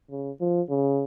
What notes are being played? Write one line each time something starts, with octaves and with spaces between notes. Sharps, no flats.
C#3
F3
C#3